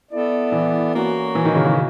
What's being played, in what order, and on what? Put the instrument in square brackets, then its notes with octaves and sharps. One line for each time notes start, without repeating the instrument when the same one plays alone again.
[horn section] B3 E4 A4 D5
[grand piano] E3
[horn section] A#3 C#4 F#4
[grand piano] E3
D#3
C#3
C#3